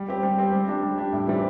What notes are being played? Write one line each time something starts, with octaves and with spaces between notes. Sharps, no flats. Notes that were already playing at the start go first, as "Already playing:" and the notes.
Already playing: G3
C4 G4
G3
C4 G4
G3
D4 G4
G3
D4 G4
A2
E3 G3 C4